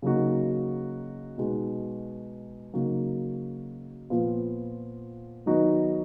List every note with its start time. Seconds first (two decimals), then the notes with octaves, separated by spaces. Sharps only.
0.02 C#3 F#3 A#3 D#4 F#4
1.38 B2 G#3 D#4 F#4
2.74 C#3 F#3 A#3 D#4 F#4
4.10 A#2 F3 B3 F4
5.46 D#3 F#3 B3 D#4 F#4